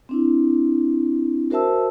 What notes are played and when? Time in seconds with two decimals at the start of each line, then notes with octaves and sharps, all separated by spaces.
0.09 C4 D4 E4
1.50 F#4 A#4 C5 E5 A5 E6